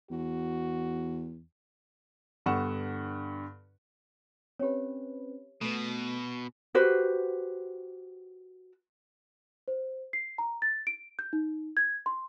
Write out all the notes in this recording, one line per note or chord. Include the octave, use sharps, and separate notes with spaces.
E2 F#4
G2 D3 B3 F#5 C#6 E7
C4 C#4 G4 B4 C#5
B2 A3 B3
F#4 G4 B4 C5
C5
C7
A#5
A6
D7
G6
D#4
G#6
C6